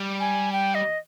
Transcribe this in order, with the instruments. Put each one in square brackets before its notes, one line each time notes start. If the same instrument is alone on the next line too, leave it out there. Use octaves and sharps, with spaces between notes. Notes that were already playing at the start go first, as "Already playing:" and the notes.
Already playing: [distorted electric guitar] G3
[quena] G#5
G5
D#5